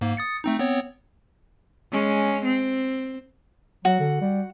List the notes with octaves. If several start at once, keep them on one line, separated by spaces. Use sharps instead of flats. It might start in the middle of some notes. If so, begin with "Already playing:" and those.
G#2 A#3
D#6 A6 C#7
A3 C4 D#4
B3 C4 C#5
G#3 C#4
C4
F#3 F#4
D3
G3